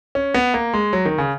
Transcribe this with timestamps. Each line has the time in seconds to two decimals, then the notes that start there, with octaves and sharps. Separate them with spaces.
0.15 C#4
0.34 B3
0.54 A#3
0.73 G#3
0.93 F#3
1.05 D#3
1.18 C#3